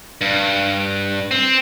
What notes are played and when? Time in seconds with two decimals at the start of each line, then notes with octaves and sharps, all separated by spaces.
0.21 G2
1.31 C4